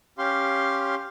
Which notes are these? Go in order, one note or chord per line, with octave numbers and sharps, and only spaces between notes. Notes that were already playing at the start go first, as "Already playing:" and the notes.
C#4 G4 F5 C6